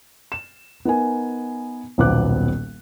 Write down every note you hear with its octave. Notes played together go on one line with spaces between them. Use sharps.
E7
B3 D#4 A#4 G#5
D#1 B1 B3 C5 D6 F#6